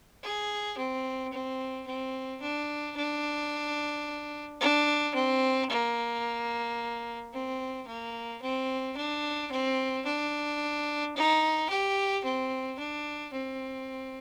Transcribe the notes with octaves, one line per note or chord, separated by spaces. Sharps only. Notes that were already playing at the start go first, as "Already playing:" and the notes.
G#4
C4
C4
C4
D4
D4
D4
C4
A#3
C4
A#3
C4
D4
C4
D4
D#4
G4
C4
D4
C4